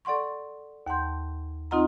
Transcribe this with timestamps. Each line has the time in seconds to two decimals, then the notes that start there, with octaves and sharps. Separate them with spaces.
0.05 A4 D5 F#5 C6 C#6
0.86 D#2 F#5 A5 C6 G6
1.71 C4 D#4 F4 D#5 F#5 A#5